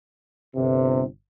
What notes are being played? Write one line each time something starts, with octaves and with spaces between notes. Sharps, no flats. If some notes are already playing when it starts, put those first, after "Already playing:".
G1 C3